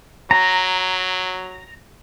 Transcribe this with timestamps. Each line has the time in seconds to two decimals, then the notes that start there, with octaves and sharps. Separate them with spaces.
0.31 F#3 A#5